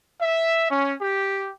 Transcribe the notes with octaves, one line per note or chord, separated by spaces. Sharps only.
E5
C#4
G4